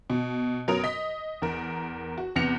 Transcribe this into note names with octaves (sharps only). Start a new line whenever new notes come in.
B2
F#2 F#3 B3 A#4 D#6 F7
D#5 B6
E2 A#4
F#4
E2 C3 B3 A#6 C#7 F7